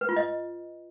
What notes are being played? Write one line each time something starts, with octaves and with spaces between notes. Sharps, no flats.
B4
F4
D#5